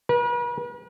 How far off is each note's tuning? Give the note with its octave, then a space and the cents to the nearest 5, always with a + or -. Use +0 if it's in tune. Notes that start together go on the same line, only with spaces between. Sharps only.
B4 -45